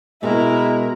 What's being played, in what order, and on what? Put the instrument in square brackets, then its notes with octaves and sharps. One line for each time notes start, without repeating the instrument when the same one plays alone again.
[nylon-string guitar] B2 [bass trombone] G#3 [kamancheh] E4 [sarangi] A#4